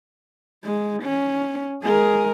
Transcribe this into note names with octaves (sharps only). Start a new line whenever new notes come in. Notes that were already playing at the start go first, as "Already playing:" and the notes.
G#3
C#4
G#3 G#4 A#4